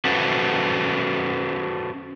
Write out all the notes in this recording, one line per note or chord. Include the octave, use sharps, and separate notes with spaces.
C#4 F#4 A4 B4 C5